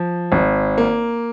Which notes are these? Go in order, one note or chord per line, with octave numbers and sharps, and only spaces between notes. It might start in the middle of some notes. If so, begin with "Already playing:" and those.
Already playing: F3
G#1
A#3